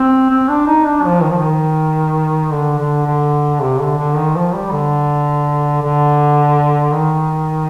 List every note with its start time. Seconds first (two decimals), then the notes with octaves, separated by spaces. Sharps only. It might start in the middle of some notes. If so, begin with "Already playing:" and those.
Already playing: C4
0.30 C4
0.49 D4
0.67 D#4
0.85 D4
1.04 F3
1.22 D#3
1.30 F3
1.38 D#3
2.51 D3
2.78 D3
3.06 D3
3.61 C3
3.80 D3
3.98 D3
4.16 D#3
4.35 F3
4.54 G3
4.71 D3
5.82 D3
6.92 D#3